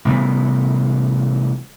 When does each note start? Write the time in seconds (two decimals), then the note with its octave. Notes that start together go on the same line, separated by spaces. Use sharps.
0.05 A1 C3 G3 B3